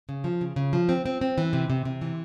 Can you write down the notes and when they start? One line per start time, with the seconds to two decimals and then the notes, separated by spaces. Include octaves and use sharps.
0.09 C#3
0.24 F3
0.41 C#3
0.56 C#3
0.73 F3
0.89 C4
1.06 C4
1.21 C4
1.38 E3
1.53 C3
1.70 C3
1.85 C3
2.01 E3